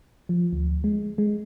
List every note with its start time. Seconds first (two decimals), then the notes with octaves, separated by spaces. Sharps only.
0.29 F3
0.53 D2
0.84 G#3
1.18 G#3